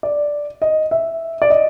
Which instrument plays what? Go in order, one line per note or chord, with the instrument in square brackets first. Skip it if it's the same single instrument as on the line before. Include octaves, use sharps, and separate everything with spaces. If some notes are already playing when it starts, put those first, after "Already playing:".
[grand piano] D5
D#5
E5
D5
D#5